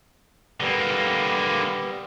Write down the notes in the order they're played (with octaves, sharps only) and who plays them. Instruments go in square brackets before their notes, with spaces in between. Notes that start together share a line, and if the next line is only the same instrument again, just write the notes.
[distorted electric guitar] D3 A#3 [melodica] G3 B3